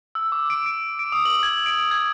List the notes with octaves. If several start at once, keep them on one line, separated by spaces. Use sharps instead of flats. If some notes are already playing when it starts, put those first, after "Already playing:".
E6
D6
D7
D7
D7
D#6
F#7
G#6
D7
G#6